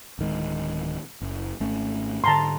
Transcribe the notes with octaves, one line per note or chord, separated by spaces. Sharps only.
D1 D#3 G#3
F#1
G#1 A3 C#4
G#2 D3 A5 A#5 C6